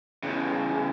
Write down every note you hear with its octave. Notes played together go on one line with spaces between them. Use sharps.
E2 C#3